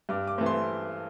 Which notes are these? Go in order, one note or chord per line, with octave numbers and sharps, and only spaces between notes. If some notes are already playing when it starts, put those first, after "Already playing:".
G2 D6
D6
E3 A3 C4
C6